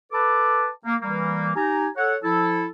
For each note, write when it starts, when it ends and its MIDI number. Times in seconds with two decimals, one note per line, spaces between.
0.12 0.68 69
0.12 0.68 71
0.12 0.68 81
0.12 0.68 83
0.12 0.68 86
0.85 0.96 58
1.02 1.51 52
1.02 1.51 55
1.02 1.51 58
1.56 1.88 63
1.56 1.88 67
1.56 1.88 80
1.56 1.88 82
1.97 2.16 69
1.97 2.16 73
1.97 2.16 78
2.23 2.66 53
2.23 2.66 64
2.23 2.66 69